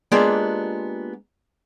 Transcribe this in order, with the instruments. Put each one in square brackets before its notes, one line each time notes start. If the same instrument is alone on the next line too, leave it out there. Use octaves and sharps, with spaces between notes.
[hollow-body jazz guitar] G#3 A#3 B3 D4 F4 G4